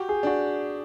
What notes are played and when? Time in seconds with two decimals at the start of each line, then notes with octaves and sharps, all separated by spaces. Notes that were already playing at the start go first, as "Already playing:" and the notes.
Already playing: F#4 G4
0.09 G#4
0.23 D4 F#4